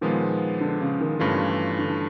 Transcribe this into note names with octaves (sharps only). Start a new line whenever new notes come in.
A#2 D#3 F3 G#3 B3
D3
C#3
D#3
G2 C#3 E3 A3 C#4 F4
D3